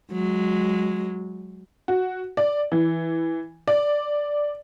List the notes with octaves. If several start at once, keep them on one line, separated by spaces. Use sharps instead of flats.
F#3 G#3
F#4
D5
E3
D5